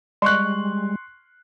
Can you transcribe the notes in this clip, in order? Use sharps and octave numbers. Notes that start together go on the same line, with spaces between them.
G3 G#3 C6 C#6 F#6